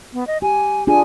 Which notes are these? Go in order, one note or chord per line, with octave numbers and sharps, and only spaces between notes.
B3
D#5
G4 G#5
D4 F4 G#4 G#5